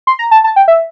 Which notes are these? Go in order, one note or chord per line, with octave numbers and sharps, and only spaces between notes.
C6
A#5
A5
A5
G5
E5